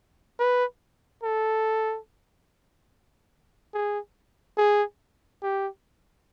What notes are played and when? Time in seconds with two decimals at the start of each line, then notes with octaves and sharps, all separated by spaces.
0.39 B4
1.23 A4
3.74 G#4
4.57 G#4
5.42 G4